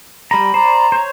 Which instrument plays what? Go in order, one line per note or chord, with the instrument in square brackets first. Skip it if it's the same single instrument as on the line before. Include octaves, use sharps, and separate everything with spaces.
[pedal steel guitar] G3 A#5 [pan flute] B5
[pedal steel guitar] C5 D5 [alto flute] A#5
[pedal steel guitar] C5 C#5